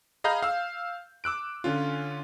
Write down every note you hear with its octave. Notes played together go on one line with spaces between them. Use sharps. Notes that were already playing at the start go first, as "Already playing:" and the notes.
G#4 D#5 F5 A#5 B5 G6
F5 E6
D6 E6 F#6 D7
D3 C#4 F4